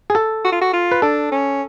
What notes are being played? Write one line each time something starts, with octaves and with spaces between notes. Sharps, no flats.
G#4
A4
F#4
F4
F#4
F4
B4
D4 A4
C#4